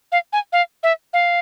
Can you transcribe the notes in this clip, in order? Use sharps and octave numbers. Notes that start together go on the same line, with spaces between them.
F5
G#5
F5
E5
F5